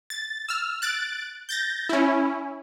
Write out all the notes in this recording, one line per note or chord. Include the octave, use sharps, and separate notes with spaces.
A6
E6 F6
F#6 A6 D7
G6 A6 A#6
C#4 E4